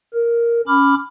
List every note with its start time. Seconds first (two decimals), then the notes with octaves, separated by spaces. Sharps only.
0.14 A#4
0.68 C#4 B5 D6 F6